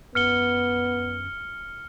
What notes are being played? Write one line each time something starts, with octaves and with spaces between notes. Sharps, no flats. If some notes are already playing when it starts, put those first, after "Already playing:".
F#2 B3 F6 C#7 G7